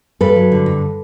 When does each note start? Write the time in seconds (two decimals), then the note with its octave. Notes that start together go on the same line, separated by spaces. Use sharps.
0.21 G2 A4 B4
0.36 F#3
0.52 D3
0.66 G2